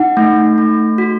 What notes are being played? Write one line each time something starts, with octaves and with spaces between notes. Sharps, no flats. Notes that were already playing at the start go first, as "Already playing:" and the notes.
Already playing: D#4 F#5
A3
A3
F#4